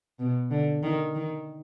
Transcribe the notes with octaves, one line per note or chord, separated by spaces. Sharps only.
B2
D3
D#3
D#3